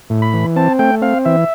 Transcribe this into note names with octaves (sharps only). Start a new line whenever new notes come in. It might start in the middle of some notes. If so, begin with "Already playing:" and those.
A2
B5
E3
C4 A5
A3 G5
C4 F5
E3 E5